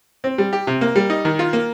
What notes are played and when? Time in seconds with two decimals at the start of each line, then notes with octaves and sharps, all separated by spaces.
0.24 C4
0.38 G3
0.53 G4
0.67 C3
0.81 A#3
0.95 G3
1.10 D#4
1.25 D#3
1.39 F4
1.53 A#3